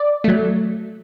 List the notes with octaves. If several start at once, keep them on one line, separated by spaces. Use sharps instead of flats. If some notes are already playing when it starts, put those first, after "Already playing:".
Already playing: D5
F#3 A3